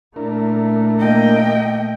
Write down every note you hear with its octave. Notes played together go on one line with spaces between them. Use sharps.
A#2 A3 D4 E4 A#4
A#3 D#5 G5